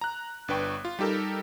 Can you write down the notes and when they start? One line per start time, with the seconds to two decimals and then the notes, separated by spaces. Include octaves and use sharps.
0.01 A#5 F#6
0.48 G1 D4 B4 G5 C#6
0.85 F4
0.99 G3 D#4 G4 A4 A#4